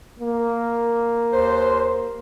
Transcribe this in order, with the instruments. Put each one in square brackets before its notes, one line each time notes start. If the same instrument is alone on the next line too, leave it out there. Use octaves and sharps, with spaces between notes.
[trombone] A#3
[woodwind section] D#2 C5